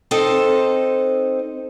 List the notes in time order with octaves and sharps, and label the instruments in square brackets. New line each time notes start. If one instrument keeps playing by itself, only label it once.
[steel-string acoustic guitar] C4 D#4 A4 C5 D#5